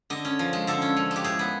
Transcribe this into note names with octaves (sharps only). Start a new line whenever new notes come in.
D3 D#5
C#4
F3
G#3
D3 A4
C#4
F3
G#3 G4
A2 G#4
B3